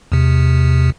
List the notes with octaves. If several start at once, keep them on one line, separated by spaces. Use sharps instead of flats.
E2 C3